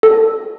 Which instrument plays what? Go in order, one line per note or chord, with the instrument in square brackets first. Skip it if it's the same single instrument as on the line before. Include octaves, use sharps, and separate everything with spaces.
[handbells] A4